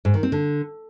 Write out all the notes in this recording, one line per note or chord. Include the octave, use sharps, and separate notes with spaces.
G#2
D#3
C4
D3